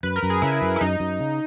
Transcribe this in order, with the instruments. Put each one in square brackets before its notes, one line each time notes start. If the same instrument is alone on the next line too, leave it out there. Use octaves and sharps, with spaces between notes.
[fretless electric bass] F#2 [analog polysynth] B4
[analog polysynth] A#4
[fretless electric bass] F#2
[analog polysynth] G#4
[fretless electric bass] C#3 [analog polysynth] E4
[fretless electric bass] F#2
[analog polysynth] E4
[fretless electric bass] F#2 [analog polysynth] D#4
[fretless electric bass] F#2
C#3